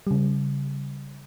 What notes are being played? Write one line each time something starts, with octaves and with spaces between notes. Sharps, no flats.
C#3 G3